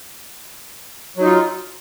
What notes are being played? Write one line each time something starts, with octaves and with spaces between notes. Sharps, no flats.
F#3 D#4 F4